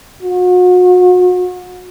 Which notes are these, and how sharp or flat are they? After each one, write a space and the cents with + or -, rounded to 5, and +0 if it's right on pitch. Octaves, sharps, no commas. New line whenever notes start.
F#4 -35